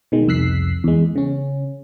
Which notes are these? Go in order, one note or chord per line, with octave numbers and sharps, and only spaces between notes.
B2 D#3 G#3
C2 F2 E6 F#6 B6 C7
E2 G#3
C#3 C#4